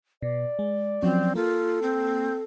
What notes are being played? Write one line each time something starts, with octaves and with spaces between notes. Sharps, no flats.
B2 D5
G#3
F3 F#3 C4 C#4
A#3 F4 A4
C4